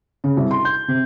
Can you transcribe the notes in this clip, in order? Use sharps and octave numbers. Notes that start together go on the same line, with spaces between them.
C#3
C2
C6
G6
C3